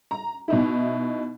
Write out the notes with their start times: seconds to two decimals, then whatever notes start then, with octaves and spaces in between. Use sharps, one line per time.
0.11 A#5
0.48 B2 D#4 E4